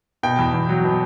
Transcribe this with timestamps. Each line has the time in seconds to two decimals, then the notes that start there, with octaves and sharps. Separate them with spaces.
0.23 B2 G5
0.39 E2
0.54 E2
0.69 F#3
0.84 B2